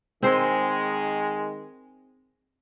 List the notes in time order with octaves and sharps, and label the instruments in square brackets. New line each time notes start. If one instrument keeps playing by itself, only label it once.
[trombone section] D#3 G#3 [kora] C4 C5